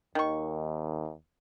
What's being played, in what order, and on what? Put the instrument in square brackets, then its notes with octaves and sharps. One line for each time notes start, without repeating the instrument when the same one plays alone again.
[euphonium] D#2 [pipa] D#3 C#6